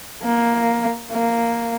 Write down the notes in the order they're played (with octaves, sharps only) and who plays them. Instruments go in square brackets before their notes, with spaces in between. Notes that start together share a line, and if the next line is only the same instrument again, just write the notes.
[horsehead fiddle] A#3
A#3